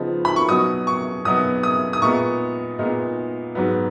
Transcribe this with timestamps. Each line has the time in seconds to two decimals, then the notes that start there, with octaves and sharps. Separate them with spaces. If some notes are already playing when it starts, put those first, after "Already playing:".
Already playing: C#3 F3 B3 D#4
0.25 B5
0.36 C#6
0.49 B2 F#3 B3 D#4 D#6
0.87 C#6
1.25 B2 F#3 B3 D#4 D#6
1.63 D#6
1.93 D#6
2.02 A#2 G#3 B3 D#4 C#6
2.79 A#2 G#3 B3 D#4
3.55 G#2 F#3 B3